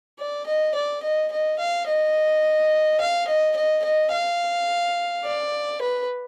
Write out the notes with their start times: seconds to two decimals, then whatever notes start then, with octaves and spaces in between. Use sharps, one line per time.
0.19 D5
0.46 D#5
0.75 D5
1.03 D#5
1.32 D#5
1.59 F5
1.87 D#5
3.00 F5
3.27 D#5
3.56 D#5
3.84 D#5
4.12 F5
5.25 D5
5.81 B4